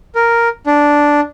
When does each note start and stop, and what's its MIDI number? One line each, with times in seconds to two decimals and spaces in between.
0.15 0.48 70
0.66 1.21 62